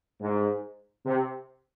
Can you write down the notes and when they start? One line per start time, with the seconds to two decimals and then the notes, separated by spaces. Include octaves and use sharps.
0.21 G#2
1.06 C3